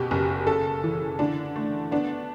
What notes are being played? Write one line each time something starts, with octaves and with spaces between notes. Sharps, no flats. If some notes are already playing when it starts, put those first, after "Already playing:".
Already playing: F#1 B2 G4
F#1
C#3 A4
E3
D3 D4
A3
B3 D4